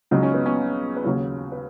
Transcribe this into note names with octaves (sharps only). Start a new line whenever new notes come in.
C#2 C#3 F#3 D#4
C#4
B3
C#4
B4
D#2 C#3 F#3 C#5
B4